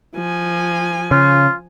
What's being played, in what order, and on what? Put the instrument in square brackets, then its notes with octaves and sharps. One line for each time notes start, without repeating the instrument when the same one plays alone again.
[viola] F3 G#5
[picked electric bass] C#3 [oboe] F4